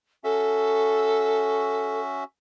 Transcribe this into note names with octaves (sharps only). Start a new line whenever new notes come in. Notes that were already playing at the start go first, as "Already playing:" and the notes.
C#4 F#4 A4 E5